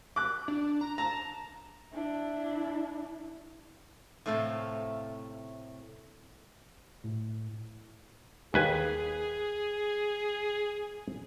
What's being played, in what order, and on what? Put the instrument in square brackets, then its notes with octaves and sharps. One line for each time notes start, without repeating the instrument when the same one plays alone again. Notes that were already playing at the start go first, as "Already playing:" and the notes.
[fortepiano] D6 F#6
[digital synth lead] D4
A#5
[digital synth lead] A5 [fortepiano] A#5
[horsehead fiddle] D4 E4
[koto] A2 C3 A3 A4 F5
[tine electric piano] A2
[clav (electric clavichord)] D#2 B4 G#5 [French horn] G#4